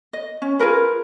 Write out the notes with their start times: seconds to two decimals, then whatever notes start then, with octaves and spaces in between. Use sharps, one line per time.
0.13 D#5
0.42 C#4
0.59 F4 G#4 A#4 B4